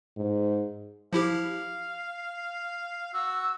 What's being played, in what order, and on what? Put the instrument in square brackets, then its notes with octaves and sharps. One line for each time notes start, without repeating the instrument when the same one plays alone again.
[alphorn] G#2
[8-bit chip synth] F3 E4 G4 [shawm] F5
[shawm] F#4 [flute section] E6